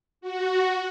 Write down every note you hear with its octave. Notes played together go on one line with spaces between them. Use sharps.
F#4